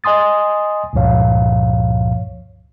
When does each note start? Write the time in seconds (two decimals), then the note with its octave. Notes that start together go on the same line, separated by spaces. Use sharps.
0.04 D#5 G#5 C6 D#6 A6
0.93 C#2 G2 A#2 F3 C#5 F5